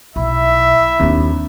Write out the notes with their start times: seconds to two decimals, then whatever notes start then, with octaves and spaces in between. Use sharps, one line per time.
0.16 B1 E4 E5
1.00 D#2 C4 D4